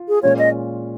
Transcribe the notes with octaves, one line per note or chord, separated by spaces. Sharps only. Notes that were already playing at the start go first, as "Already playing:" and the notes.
Already playing: F4
G#4
A#2 G#3 C#4 F4 C#5
D#5